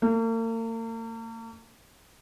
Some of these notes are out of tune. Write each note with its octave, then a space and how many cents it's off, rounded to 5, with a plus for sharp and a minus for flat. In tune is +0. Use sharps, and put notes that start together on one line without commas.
A#3 -45